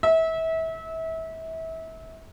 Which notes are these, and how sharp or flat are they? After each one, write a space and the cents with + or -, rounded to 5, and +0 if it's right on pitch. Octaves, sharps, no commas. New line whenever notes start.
E5 -30